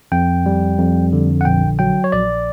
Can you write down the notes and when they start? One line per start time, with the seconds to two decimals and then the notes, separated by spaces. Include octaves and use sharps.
0.12 F2 G5
0.46 G3
0.78 F2
1.13 D3
1.41 F#5
1.45 A#1 G5
1.79 F#3 G5
2.04 C#5
2.12 A#1 D5